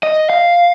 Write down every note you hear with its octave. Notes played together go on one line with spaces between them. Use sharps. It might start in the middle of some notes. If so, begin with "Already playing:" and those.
D#5
F5